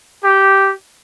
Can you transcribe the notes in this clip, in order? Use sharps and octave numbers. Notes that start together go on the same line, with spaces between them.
G4